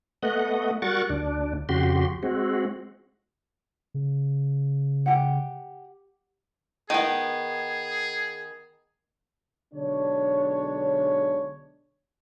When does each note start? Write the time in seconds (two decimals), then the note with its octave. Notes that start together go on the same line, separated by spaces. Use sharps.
0.23 A3 B3 D#5 F#5
0.82 G3 F#4 A#4 F#5 C#6 A6
1.10 D2 D4
1.69 F2 C#3 F#4 G4 C6
2.23 G#3 C4 F#4
3.94 C#3
5.06 G4 F#5
6.90 D#3 B3 G#4
9.74 B1 D3 G#3 D4 C#5